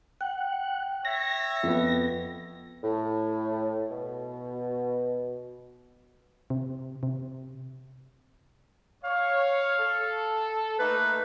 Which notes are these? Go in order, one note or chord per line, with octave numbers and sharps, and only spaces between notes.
F#5 G5
C#5 E5 A#6
F2 B3
A2
B2
C3
C3
C#5 F5
A4
A3 A#3 D#4 B4